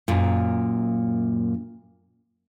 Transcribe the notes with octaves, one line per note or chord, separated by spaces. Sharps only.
F#2 A#2